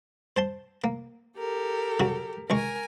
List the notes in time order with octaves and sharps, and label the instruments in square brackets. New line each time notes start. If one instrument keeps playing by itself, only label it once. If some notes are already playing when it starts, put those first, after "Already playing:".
[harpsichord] C5 A5 C6
A#3
[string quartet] G4 A4 A#4
[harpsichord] C#3 F#3 F#4
[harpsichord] C#2 G#3 C#6 [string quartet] A#4 G#5